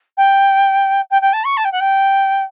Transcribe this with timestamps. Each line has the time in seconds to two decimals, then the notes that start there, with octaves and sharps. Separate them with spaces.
0.17 G5
1.10 G5
1.21 G5
1.33 A5
1.44 C#6
1.57 A5
1.64 G5
1.72 F#5
1.80 G5